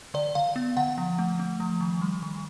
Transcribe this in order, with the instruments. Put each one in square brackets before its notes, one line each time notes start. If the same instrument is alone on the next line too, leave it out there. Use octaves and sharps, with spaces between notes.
[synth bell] D3 D5
D3 F5
B3
D3 F#5
F3
A3
A3
F3
D#3
G3
D#3